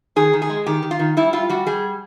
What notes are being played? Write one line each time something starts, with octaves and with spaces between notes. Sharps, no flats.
D#3 G#4
D#3
G#4
G#3
D#3 G4
D#3
F4
D#3
G3 E4
G3 F4
G3 F#4
G3 G#4